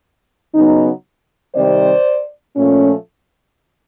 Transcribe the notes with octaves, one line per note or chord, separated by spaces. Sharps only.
C#3 F#3 B3 D#4
C3 D#3 G3 C4 C5 D5
A#2 F3 A3 C#4